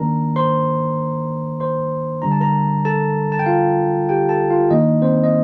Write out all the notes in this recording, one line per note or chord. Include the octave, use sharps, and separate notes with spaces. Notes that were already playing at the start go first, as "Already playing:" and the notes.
Already playing: D#3 A#3 D4 A#4 A#5
C5 C6
C5 C6
D3 G3 D4 A#5
A5
A#4 A#5
A4 A5
A5
G5
F4 F5
G4 G5
A4 A5
F4 F5
D#3 A#3 D4 D#4 D#5
C4 C5
D#5